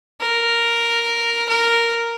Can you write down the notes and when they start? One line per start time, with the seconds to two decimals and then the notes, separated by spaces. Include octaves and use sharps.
0.21 A#4
1.49 A#4